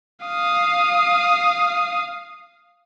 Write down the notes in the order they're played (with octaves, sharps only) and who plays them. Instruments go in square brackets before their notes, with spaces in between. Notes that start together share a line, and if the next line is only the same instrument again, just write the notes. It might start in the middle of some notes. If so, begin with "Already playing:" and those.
[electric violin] F5 D#6